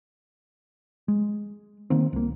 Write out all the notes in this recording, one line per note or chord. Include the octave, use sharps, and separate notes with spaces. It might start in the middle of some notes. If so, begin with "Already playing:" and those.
G#3
D#3 A#3 C4
C2 A#3